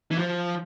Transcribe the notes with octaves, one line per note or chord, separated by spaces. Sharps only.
E3
F3